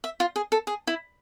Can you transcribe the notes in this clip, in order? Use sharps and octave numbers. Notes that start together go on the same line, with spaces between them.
E5
F4
G#4
A4
G#4
E4